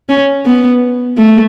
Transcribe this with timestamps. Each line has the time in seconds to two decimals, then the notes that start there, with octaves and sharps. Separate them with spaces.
0.09 C#4
0.45 B3
1.17 A3